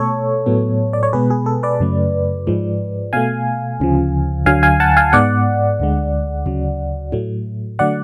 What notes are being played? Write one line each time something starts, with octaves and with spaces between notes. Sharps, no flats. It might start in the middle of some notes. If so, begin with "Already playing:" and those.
Already playing: B2 A3 A4 C#5
A2 F#3 B3
D5
C#5
B2 G#3 B3 G#4 B4
G#4
A4
B4 D5
F#2 C#3 F#3 A3
G#2 F3 G#3
B2 A3 F5 G#5
D2 C#3 F3
D2 D3 F#3 F5 G#5
F5 G#5
F#5 A5
F5 G#5
G#2 G#3 B3 D5 F#5
D2 D3 G#3
D2 C#3 F#3
A2 F#3 A3
D3 F#3 A3 D5 F#5